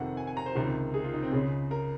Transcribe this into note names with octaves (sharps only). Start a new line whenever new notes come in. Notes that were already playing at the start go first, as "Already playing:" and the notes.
Already playing: F2 C3 D#3 F#5
G#5
G#5
A#5
C5
C#2 C3 D#3 A#4
G#4
F4
D#4
C4
C#2 C#3 G#4
A#4